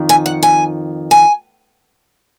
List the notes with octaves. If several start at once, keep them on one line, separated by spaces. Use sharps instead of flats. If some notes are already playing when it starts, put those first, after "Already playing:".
Already playing: F2 D#3
G#5
F#5
G#5
G#5